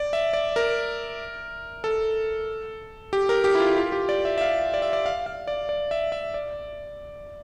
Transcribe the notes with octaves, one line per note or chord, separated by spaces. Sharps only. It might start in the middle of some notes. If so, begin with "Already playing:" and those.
Already playing: D5
E5
D5
A#4
A4
G4
A#4
G4
E4
F4
F4
G4
D5
E5
E5
F5
D5
E5
D5
F5
F5
D5
D5
E5
E5
D5